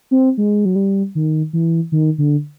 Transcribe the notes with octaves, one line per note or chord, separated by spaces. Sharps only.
C4
G#3
F#3
G3
D#3
E3
D#3
D3